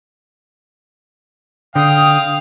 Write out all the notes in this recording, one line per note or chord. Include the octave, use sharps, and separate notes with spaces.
D3 F5 G5 D#6